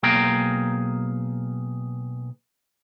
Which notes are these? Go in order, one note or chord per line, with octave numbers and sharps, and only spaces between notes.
B1 A#3 G#4 G5 A#5